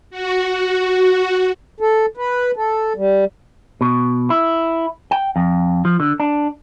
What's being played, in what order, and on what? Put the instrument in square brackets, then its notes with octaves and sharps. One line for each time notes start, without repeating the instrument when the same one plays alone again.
[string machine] F#4
[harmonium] A4
B4
A4
G3
[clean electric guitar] B2
E4
G5
F2
F3
D3
D4